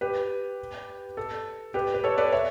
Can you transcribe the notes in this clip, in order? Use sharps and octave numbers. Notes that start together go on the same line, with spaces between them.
G4 B4
A4
G4 B4
B4
A4 C#5
B4 D5
C#5 E5